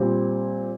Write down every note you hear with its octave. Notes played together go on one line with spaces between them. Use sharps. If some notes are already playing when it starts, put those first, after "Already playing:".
Already playing: A#2 G3 C4